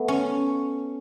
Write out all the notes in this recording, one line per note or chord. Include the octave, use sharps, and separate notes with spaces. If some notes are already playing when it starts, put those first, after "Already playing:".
Already playing: A3 B3
C#4